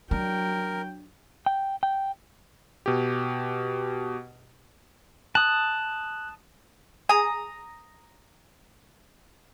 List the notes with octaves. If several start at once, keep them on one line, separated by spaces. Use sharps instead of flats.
F#3 D4 A#4 G5
G5
G5
B2 G4
A5 D#6 F#6
G#4 A#5 D#6